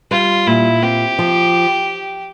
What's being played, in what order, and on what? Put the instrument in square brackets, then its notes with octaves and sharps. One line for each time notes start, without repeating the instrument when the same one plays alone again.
[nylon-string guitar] G3 [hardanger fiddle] F4
[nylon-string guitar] A#2 [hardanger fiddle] E4
[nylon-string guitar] C4 [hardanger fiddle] G4
[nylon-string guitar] F3